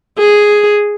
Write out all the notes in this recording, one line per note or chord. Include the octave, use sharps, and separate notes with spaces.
G#4